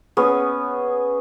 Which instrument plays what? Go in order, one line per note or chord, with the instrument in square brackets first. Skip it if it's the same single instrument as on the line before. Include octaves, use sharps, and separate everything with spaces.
[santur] B3 C#4 G#4